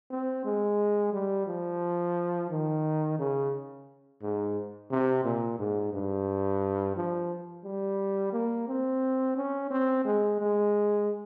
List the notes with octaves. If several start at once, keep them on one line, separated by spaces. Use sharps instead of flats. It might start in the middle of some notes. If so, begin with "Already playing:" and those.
C4
G#3
G3
F3
D#3
C#3
G#2
C3
A#2
G#2
G2
F3
G3
A#3
C4
C#4
C4
G#3
G#3